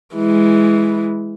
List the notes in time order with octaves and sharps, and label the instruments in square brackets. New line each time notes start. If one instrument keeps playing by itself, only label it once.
[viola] E3 G#3